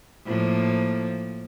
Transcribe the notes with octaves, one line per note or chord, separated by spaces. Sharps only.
A2 F3 A#3